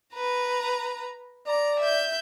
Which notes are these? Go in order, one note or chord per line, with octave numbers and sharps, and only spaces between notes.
B4 A#5
D5 A#5
E5 G6